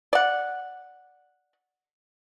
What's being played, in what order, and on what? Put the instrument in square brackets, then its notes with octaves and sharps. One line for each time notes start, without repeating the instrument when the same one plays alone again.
[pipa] D5 F#5